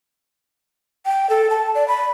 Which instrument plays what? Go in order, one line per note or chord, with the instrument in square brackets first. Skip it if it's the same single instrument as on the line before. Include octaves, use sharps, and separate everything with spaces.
[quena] G5
A4
A5
D5
B5